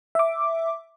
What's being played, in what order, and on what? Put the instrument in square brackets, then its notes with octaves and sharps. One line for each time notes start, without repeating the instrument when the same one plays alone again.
[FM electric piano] E5 D6